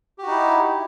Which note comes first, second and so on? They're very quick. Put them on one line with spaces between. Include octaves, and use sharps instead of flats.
G4 F#4 D#4 E4